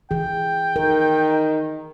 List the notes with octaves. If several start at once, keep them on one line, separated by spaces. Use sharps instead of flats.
E3 G#4 G5
D#3 A#4